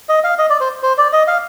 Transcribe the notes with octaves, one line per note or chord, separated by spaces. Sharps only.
D#5
F5
D#5
D5
C5
C5
D5
D#5
F5